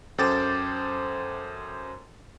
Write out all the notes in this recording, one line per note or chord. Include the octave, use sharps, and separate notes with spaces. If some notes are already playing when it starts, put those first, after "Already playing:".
F#2 A4 C5 G5 D6 A6